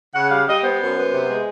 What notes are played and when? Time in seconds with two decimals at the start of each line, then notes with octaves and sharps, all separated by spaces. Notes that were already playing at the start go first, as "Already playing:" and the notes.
0.14 C#3 F#5
0.31 G3 F5
0.47 G3 D#5
0.63 B3 C5
0.80 F#2
0.96 B3
1.12 C3
1.29 G#3